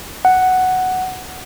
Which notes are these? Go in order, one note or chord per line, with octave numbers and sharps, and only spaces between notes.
F#5